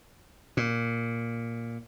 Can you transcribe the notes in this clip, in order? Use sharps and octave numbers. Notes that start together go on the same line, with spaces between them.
A#2